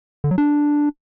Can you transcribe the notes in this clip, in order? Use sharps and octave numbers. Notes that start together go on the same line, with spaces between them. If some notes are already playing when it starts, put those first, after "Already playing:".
D3
F#3
D4